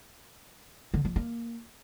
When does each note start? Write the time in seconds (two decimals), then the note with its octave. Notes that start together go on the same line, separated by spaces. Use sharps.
0.94 D3
1.05 F3
1.16 A#3